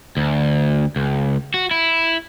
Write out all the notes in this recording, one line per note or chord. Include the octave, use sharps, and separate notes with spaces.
D2
C#2
F#4
E4